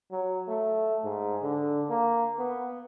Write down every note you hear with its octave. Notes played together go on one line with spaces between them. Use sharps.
F#3
A3
G#2
D3
A#3
B3